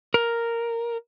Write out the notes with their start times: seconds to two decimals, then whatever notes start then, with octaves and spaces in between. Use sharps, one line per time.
0.14 A#4